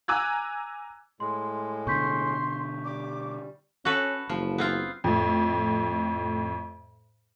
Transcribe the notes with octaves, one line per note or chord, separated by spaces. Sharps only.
G#5 A#5 D6 E6 F#6 G#6
A2 G#3 C6
B2 D3 C6 C#6 G6 B6
G3 D6
C#4 F#4 A4 B4
F#1 F3
B3 C4 F4
F2 A2